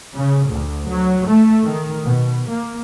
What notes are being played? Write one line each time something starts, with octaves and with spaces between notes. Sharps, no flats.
C#3
D2
F#3
A3
D#3
B2
A#3